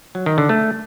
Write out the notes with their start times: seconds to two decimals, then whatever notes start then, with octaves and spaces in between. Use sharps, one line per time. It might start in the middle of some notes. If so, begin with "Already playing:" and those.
0.15 F#3
0.26 D#3
0.38 D3
0.49 A3